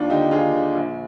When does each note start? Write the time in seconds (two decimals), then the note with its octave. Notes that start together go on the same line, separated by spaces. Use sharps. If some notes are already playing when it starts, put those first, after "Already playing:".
Already playing: D#2 D4 F4
0.10 D3 D#4 G4
0.31 D#2 F4 G#4
0.53 D3
0.75 A#1